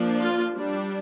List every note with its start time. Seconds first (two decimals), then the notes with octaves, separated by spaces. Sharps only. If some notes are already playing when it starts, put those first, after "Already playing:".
Already playing: F3 A#3 D4
0.20 F4
0.55 G3 D4